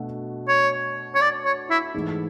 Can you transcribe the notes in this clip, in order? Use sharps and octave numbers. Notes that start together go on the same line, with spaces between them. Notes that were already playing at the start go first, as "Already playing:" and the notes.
Already playing: B2 A3 D4 F#4
C#5
C#5
D5
C#5
E4
G#2 E3 A3